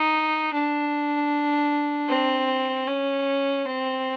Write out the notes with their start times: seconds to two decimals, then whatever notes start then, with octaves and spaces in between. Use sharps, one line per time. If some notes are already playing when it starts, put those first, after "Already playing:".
Already playing: D#4
0.53 D4
2.09 C4
2.87 C#4
3.65 C4